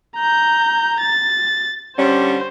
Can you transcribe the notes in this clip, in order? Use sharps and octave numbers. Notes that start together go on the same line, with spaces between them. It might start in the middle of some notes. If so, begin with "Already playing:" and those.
A#5 G6
A6
D3 G3 C#4 C5